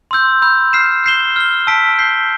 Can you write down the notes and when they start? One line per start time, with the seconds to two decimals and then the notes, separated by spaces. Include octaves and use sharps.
0.11 C6 E6 G6
0.42 B5 E6 G6
0.73 F6 C7 E7
1.04 G6 C7 E7 G7
1.36 F6 C7 G7
1.67 A5 E6 B6 D7
1.98 G6 C7 G7